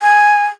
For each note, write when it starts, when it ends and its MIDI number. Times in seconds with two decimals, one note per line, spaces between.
0.02 0.46 80